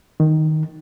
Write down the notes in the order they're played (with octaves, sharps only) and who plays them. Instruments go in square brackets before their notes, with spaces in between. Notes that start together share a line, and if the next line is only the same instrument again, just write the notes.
[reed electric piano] D#3